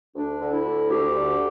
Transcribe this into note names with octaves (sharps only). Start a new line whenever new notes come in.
D2 D4
D3
E4
D2
D2 G4
D3